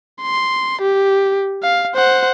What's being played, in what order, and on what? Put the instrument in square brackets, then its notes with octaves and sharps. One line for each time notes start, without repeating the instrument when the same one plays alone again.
[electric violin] C6
G4
F5
C5 F#5